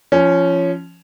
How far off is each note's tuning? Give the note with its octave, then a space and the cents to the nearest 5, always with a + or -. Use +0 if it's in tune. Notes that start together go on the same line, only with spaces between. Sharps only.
F3 -20 C#4 +0